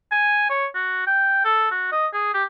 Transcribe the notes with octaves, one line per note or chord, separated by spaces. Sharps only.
G#5
C#5
F#4
G5
A4
F#4
D#5
G#4
G4